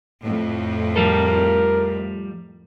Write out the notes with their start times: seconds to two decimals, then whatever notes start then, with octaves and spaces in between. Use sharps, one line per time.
0.22 F2 A2
0.96 F3 G3 A4 A#4